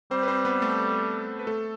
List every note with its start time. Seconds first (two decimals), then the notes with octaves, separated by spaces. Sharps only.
0.11 G3 C4 C5
0.23 B4
0.28 C4 C5
0.45 B3 B4
0.62 A3 A4
1.39 B4
1.47 A3 A4